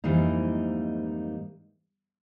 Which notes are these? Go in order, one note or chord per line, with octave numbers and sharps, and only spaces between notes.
F2 G#2 E3 G3 A#3 D#4